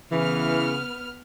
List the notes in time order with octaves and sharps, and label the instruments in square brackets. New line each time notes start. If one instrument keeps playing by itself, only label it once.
[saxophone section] C#3 E3 [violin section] B3 F6